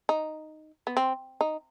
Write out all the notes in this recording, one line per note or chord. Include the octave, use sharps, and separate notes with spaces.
D#4
B3
C4
D#4